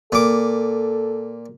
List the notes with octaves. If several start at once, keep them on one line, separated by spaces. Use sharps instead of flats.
A#2 A4 D6